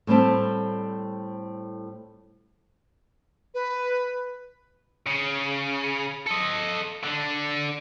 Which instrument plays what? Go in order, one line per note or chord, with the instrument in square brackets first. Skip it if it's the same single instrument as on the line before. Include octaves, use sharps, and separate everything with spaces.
[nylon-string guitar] A2 G3 C4 A5
[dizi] B4
[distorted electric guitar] C#3
A4 D#5
D3 D4